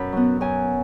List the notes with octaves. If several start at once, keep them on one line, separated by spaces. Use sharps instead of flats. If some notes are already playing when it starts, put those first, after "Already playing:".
Already playing: F#2 B2 B5
F#3 B3
F#2 G#5